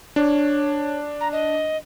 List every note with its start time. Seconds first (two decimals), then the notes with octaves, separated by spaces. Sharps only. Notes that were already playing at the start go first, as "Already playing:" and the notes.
0.16 D4 C#5
1.21 A#5
1.32 D#5